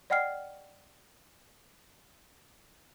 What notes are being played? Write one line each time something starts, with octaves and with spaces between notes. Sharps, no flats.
D5 D#5 F#5 G5 F6 C7